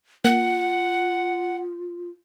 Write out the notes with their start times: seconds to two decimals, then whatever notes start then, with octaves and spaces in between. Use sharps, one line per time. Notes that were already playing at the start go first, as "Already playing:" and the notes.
0.25 A#3 F4 F#5